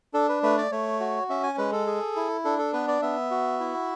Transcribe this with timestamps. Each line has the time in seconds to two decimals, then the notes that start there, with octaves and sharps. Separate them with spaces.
0.14 D4 A4
0.29 B4
0.43 A3 B4
0.58 D5
0.71 A3 C#5
1.00 F#4
1.29 C#4 E5
1.43 G#5
1.58 G#3 B4
1.72 A4
1.86 G#4
2.16 E4
2.45 D4 A4
2.59 A4
2.73 B3 B4
2.88 D5
3.02 B3 E5
3.31 F#4
3.60 E4